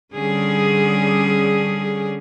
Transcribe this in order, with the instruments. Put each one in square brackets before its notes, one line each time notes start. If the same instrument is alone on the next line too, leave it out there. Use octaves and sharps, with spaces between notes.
[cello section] D3 G3 C#4 G#4